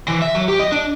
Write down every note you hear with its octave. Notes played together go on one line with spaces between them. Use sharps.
E3
E5
F#3
G4
D#5
D4